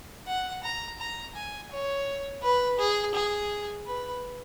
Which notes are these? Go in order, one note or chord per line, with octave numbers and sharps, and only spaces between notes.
F#5
A#5
A#5
G#5
C#5
B4
G#4
G#4
B4